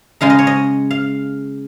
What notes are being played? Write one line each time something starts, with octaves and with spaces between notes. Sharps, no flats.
C#3 G#3 D#4 F5
D#5
C#5
D#5
F5